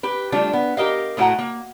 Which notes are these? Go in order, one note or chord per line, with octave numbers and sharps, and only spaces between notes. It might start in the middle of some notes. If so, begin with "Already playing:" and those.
G4 B4
G3 A3 D4 F4 G4
B3
G4 A#4 D#5 F5
A2 A3 E4 F#4 F#5 A#5
A#3